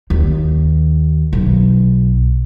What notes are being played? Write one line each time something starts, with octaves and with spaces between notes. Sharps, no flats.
D#2
B1